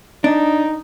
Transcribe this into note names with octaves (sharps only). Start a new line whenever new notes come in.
D4 D#4